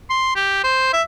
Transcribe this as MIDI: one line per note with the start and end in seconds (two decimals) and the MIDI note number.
0.10 0.32 84
0.36 0.63 67
0.64 0.91 72
0.93 1.02 76